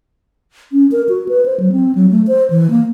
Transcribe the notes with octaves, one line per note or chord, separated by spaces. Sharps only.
C#4
A#4
F#4
B4
C5
F#3
C4
F#3
A3
C5
E3
A#3